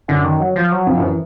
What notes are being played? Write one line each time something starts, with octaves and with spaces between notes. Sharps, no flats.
F#2 D3
D#3
F#3
F3
F#3
F2 F3
F#2
E3